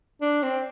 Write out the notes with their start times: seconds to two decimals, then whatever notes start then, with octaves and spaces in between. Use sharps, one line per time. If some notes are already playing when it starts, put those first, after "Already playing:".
0.21 D4
0.43 C4